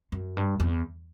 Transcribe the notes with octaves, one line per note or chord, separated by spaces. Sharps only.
F#2
G2
E2